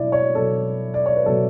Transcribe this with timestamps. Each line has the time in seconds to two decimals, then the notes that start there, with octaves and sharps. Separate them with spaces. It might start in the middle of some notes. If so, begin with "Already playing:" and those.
Already playing: B2 F#3 E4 D5
0.12 C#5
0.35 B2 F#3 A4
0.94 D5
1.06 C#5
1.16 B4
1.26 B2 F#3 A4